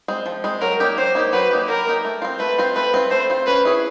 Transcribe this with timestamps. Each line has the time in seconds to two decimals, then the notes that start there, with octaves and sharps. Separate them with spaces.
0.08 G#3 C4
0.26 F3
0.44 G#3 C4
0.61 F#3 A#4
0.80 A#3 D#4 G4
0.98 F#3 C5
1.15 A#3 D#4 G4
1.33 F#3 B4
1.51 A#3 D#4 G4
1.68 F#3 A#4
1.87 A#3 D#4 G4
2.05 A3
2.22 C4 F4
2.40 A3 B4
2.58 C4 F4
2.75 A3 B4
2.94 C4 F4
3.11 A3 C5
3.30 C4 F4
3.47 C#4 B4
3.65 E4 G#4 C#5